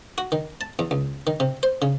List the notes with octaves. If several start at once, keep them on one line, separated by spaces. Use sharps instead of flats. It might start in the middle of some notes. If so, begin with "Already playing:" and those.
F#4
D#3
A5
E2
C#2
D#3
C3
C5
C#3